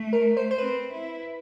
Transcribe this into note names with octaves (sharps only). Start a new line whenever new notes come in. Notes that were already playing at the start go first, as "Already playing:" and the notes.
Already playing: A3
A#4
C5
C5
C4 B4
E4